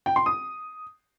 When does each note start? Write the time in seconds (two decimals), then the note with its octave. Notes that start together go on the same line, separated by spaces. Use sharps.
0.06 G5
0.16 C6
0.26 D#6